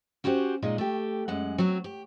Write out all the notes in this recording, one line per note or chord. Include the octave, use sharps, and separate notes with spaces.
C#4 F#4 G4 C5 D#5 F#5
A#2 G#3 D#4
A3 G4
F#2 G#3 F#5
F#3 C4 F#4
G4